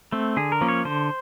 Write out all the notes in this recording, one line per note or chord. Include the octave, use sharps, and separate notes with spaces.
A3 C4
D3 G#4
A#4
F3 A#3 C#4
C#5
D3 C5